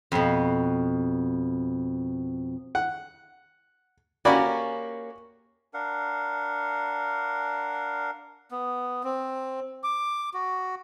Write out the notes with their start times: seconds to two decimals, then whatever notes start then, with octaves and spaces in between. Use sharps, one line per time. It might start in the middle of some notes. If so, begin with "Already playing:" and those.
0.12 F2 B2
2.75 F#5
4.25 A#3 C#4 F#4 G4 D5 B5
5.74 D4 A#4 F5 F#5
8.51 B3
9.04 C4
9.84 D6
10.34 F#4